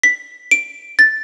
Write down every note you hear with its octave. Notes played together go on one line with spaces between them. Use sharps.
B6
D7
A6